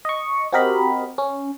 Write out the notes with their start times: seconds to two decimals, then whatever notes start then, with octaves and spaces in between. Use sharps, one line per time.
0.05 D#5 C#6
0.53 C4 F#4 G4 A#4 D#5 B5
1.18 C#4